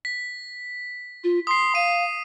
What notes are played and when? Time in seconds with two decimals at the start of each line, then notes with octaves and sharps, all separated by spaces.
0.05 B6
1.24 F4
1.47 C6 D#6 C7
1.75 F5 D#7